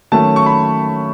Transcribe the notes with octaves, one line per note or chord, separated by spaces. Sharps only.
D#3 F#3 A3 C#4 A5
C#6
B5